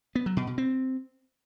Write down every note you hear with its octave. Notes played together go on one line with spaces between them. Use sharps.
B3
F#3
B2
B2
C4